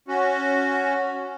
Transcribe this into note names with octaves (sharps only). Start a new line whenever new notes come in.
C#4 F#4